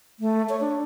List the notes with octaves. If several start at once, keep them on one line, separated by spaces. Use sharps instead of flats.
A3
C#5
D4